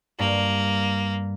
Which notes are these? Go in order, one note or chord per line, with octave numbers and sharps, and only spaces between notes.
G2 A#3